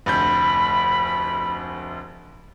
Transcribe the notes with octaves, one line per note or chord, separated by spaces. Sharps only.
F1 D2 B5 G6